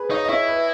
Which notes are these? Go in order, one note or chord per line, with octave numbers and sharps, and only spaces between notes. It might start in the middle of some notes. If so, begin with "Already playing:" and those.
Already playing: G#4 B4
D#4 C#5
D#5
E4 C#5
B4